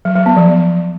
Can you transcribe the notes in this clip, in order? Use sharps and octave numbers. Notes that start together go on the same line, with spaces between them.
F#3
F#3
B3
F3